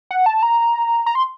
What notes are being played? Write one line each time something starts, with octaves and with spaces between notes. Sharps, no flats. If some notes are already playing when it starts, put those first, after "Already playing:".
F#5
A5
A#5
A#5
C6